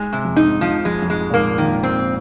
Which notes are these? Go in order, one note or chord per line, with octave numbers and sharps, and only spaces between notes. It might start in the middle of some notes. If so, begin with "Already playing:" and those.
Already playing: G#2 G#3
C3
F2
G#2 D#4
F3
F2 G#3
F2
G#2 G#3
A#2
G#2 A#3
D#3
C4